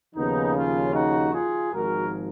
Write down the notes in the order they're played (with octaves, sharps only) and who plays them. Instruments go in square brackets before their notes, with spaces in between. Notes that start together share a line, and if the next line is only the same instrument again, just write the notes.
[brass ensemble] D#2 C#3 F3 B3 D#4
C#4 F4
D#4 F#4
F4 G#4
G#1 G#2 F3 F#4 A#4